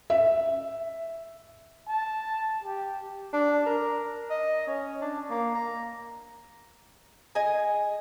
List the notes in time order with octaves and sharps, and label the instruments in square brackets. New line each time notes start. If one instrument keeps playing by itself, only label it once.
[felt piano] E5
[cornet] A5
G4
[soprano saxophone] D4
A#4
D#5
C#4
D4
A#3
A#5
[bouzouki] G#4 D#5 G#5